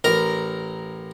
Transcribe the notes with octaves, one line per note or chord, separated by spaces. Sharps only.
A1 A#4 A#5